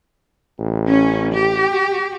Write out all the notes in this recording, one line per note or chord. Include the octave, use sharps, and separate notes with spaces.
A1
C#4
G4